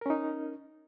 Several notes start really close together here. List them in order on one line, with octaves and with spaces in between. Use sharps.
A#4 C#4 D#4